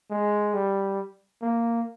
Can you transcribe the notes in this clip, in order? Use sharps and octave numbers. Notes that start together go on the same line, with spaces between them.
G#3
G3
A#3